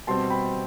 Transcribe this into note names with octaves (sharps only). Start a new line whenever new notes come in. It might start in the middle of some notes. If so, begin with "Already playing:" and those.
B2 G3 C4 A5 C6
G5 B5